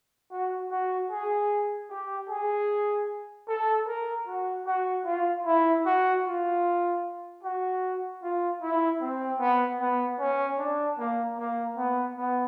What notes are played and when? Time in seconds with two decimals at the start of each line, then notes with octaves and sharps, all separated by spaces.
0.32 F#4
0.71 F#4
1.11 G#4
1.90 G4
2.29 G#4
3.48 A4
3.87 A#4
4.27 F#4
4.66 F#4
5.05 F4
5.46 E4
5.86 F#4
6.25 F4
7.43 F#4
8.23 F4
8.62 E4
9.01 C4
9.40 B3
9.80 B3
10.19 C#4
10.59 D4
10.99 A#3
11.38 A#3
11.77 B3
12.17 B3